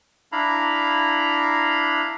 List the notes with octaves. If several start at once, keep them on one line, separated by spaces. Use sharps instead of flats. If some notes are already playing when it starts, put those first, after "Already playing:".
D4 E4 F5 A#5 B5